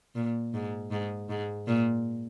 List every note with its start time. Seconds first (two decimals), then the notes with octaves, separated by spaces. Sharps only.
0.15 A#2
0.54 G#2
0.91 G#2
1.29 G#2
1.67 A#2